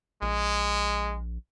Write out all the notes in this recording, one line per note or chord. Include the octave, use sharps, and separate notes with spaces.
A#1 G#3